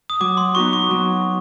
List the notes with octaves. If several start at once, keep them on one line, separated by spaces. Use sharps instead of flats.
D#6
F#3 D6
C6
B3 D#4 F#4 C#6
C#6
F#3